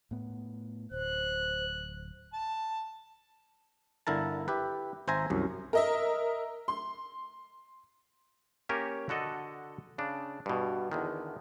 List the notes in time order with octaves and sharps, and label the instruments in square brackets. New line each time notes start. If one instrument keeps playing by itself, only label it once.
[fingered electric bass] A2 B3
[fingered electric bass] D1 [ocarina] C5 [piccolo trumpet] F#6
[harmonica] A5
[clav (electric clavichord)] G1 D3 E4 A#4 A5
E4 G4 B4
G#1 C5 E5 G#5 A#5
C2 F#2
[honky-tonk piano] A#4 D#5 E5
C6
[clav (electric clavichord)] A#3 C#4 G4 A#4 C#5
D3 F#4 A4 D#5
C#3 D4
G2 B2
E2 D3 D#3